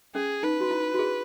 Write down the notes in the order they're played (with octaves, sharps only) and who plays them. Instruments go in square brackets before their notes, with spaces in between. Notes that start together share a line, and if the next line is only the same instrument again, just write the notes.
[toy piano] C#4 [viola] G#4
[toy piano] D#4 [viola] B4
[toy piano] F#4
E4
F#4
G#4